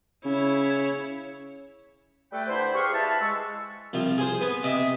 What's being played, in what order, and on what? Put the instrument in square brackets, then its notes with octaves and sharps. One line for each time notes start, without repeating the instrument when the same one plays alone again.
[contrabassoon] C#3 [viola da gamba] E4 C#5
[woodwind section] G3 A3 A4 B4 G5
D3 E4 B4 C5
G4 G#4 B4 F5 C#6
E4 B4 F5 A5
G#3 C#6 E6
[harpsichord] C2 F3
G#4 C5
B3
C3 D#5 E5